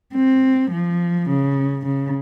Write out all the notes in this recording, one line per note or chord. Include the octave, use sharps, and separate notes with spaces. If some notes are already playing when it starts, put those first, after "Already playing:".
C4
F3
C#3
C#3